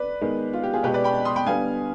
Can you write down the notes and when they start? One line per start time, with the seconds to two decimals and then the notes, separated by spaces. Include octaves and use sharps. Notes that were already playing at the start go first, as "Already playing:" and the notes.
Already playing: B4 D5
0.21 D#3 G#3 B3
0.53 F4
0.63 G4
0.74 F4 G#4
0.83 B2 G#3 B3 G4 B4
0.94 B4 D5
1.04 G5 B5
1.25 C6 D#6
1.36 G5 B5
1.46 D3 G3 B3 F5 G#5